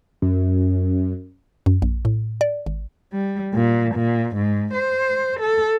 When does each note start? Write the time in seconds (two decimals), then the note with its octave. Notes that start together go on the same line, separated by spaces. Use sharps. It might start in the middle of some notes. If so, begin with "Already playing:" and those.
0.22 F#2
1.66 F#2
1.82 A#1
2.05 A2
2.41 D5
2.66 G#1
3.13 G3
3.54 A#2
3.95 A#2
4.36 G#2
4.74 C5
5.40 A4